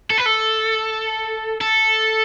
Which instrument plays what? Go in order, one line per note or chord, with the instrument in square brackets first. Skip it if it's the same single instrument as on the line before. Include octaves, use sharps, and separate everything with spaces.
[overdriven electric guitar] A4
B4
A4
A4